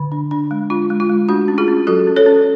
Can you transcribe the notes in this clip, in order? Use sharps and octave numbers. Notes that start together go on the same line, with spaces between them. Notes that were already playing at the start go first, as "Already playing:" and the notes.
Already playing: D3
D4
D4
G#3
D4 F4
G#3
F4
G#3
A3 D4 F#4
C#4
F4 G#4
C#4
F#3 F#4 A4
C#4
A4 C#5
C#4